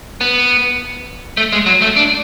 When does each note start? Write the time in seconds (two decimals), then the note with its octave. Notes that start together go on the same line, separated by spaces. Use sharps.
0.21 B3
1.37 A3
1.52 G#3
1.66 F#3
1.82 A3
1.96 D4